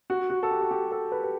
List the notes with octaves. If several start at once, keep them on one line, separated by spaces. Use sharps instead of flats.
F#4
F#4
A4
G4
F#4
G4
A4
B4
B4